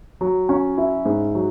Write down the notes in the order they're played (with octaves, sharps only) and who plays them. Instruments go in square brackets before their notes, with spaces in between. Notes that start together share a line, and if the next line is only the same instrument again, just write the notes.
[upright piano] F#3
C#4
E4
G#2
F#3